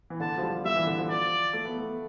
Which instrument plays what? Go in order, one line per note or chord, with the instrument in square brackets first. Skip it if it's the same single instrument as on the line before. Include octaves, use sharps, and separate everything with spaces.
[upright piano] E3
[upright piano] D3 [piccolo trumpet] A5
[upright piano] F3
G3
[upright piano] G3 [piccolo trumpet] E5
[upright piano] E3
D3
F3
[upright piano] F3 [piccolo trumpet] D5
[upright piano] A3
B3
A3